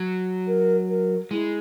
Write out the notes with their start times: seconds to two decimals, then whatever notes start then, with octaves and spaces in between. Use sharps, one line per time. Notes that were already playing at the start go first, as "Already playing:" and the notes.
Already playing: F#3
0.47 A#4
0.89 A#4
1.31 G#3 E4